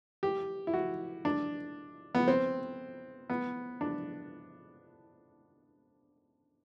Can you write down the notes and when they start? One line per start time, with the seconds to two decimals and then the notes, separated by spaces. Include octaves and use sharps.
0.23 G4
0.67 E4
0.74 F#4
1.25 D4
2.15 B3
2.28 C4
3.30 B3
3.81 D4